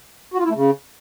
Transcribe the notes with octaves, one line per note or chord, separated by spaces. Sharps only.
F#4
F4
E4
A3
C#3